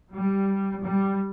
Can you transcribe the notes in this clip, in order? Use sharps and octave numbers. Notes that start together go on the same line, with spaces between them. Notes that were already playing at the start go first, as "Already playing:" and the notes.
G3
G3